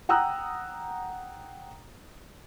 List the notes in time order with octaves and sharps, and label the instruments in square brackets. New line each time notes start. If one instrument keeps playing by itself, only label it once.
[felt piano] F#5 G5 A#5 D#6 E6 F#6